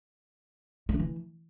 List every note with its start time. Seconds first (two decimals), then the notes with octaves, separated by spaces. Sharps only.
0.89 A3
0.94 D4
0.99 E3